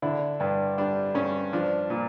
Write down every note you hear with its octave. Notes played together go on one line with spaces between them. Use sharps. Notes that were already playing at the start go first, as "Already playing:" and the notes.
D3 D4 E4
G2 D4
G3 D4
G2 C#4
F3 D4
A#2